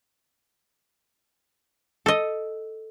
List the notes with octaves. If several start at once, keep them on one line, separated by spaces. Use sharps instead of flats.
A4 D#5